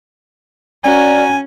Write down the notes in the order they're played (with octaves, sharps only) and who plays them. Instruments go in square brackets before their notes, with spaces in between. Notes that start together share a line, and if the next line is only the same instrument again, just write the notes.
[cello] C#4 [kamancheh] F#4 A#4 [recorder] D5 [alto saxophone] G#5